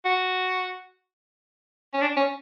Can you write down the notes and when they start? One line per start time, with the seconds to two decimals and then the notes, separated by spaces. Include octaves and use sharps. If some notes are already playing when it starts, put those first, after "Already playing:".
0.05 F#4
1.93 C#4
2.01 D4
2.17 C#4